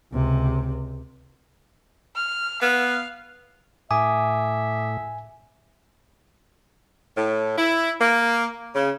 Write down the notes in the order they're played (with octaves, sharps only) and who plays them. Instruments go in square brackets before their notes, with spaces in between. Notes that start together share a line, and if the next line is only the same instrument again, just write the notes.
[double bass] C#2 C3
[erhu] F6
[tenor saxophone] B3 [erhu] F5
[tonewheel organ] A2 [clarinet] E5 [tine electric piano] G#5 [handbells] D6 D#6
[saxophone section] A2
E4
A#3
C#3